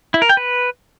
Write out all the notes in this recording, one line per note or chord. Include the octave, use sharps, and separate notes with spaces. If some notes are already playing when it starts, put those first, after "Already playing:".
E4
A#4
G5
B4